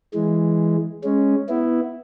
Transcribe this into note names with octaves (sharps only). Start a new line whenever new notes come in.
E3 G#3
G#3 C#4
B3 E4